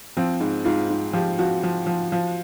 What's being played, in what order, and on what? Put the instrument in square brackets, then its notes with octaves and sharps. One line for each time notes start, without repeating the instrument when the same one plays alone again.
[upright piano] F3 C4
G#2
G#2 F4
G#2
F3 G4
F3 F#4
F3
F3
F3